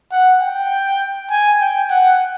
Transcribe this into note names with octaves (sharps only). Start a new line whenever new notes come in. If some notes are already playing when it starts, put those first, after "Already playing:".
F#5
G5
G#5
G5
F#5